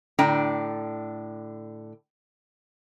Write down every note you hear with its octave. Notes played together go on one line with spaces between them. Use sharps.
A2 D3 D4 G5 A#5